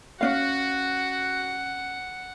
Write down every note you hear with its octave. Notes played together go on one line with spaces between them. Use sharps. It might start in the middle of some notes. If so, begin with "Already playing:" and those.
C#4 D4 F#4 F5 F#5